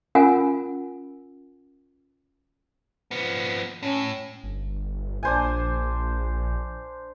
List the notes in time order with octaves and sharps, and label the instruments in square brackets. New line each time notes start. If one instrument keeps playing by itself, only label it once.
[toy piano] C#4 F4 A#4 F#5 G#5
[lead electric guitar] F3 B3
[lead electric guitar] A2 [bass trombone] C#4
[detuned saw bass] G1
[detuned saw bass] A#1 [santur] D4 C5 G#5